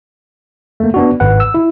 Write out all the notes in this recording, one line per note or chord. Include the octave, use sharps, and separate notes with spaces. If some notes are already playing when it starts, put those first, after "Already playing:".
A3 A#3
B3 D4 F#4
G#1 B4 F#5
E6
E4